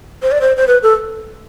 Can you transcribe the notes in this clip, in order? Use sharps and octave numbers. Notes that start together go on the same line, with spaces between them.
C5
D5
C5
C5
B4
A4